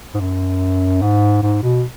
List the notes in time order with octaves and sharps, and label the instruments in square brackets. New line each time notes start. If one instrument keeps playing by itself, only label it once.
[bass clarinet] G#2
F#2
G#2
G#2
B2